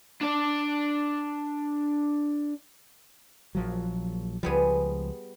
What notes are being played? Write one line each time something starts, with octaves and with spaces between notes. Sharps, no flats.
D4 D5
A#1 F3 F#3
C#2 F3 G3 B3 G#4